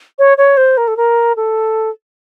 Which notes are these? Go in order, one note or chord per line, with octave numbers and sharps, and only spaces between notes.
C#5
C#5
C5
A#4
A4
A#4
A4